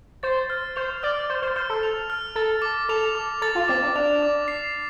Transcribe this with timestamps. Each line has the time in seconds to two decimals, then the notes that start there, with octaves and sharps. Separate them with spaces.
0.23 C5 A6
0.50 F6
0.76 C5 F7
1.03 D5 F6
1.29 C5 A6
1.42 C5
1.56 C5 F6
1.70 A4
1.83 F7
2.10 F6
2.35 A4 A6
2.62 D6
2.89 A4 F7
3.15 D6
3.42 A4 A6
3.55 F4
3.68 C4 D6
3.82 D4
3.95 D4 F7
4.22 D6
4.48 C7